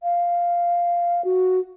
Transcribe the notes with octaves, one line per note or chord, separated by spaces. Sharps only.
F5
F#4